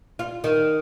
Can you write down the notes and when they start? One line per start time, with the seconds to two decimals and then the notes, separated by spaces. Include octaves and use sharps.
0.19 F4
0.44 D#3